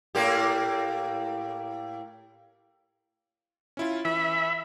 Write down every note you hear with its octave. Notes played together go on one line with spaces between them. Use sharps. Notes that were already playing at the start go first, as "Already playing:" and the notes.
A2 A#3 G4
C#4 E4 F4
E3 E5 B5